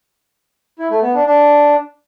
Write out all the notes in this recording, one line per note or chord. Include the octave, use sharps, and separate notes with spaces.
E4
A3
B3
D4
D4